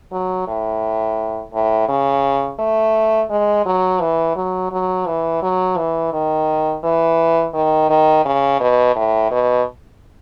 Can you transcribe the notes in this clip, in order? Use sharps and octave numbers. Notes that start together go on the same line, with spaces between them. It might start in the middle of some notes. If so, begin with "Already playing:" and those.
F#3
A2
A2
C#3
A3
G#3
F#3
E3
F#3
F#3
E3
F#3
E3
D#3
E3
D#3
D#3
C#3
B2
A2
B2